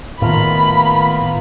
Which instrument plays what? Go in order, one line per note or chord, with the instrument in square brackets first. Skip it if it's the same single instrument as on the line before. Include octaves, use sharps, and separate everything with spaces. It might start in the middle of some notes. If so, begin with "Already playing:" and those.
[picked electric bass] A2 D#3 [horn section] A#3 B3 F4 [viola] B5